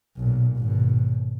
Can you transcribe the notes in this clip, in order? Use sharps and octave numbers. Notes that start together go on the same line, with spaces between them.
B1 A#2
G#1 B2